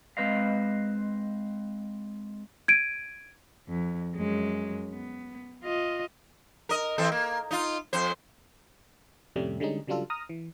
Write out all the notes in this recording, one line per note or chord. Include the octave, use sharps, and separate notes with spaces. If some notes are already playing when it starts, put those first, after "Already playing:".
G#3 C4 B4 C5 D#5 F5
G#6 D7 D#7
F2
F#2 G#3
B3
F4 D#5
A#4 D#5
E3 C4 A4
A#3
D#4 F4
F2 C5
F2 A2 C3 G3 A3 C#4
D3 G3 G#3 C#4 D#4
C#3 F#3 G3 D4 F4 A4
A#5 D#6 F6 A#6
E3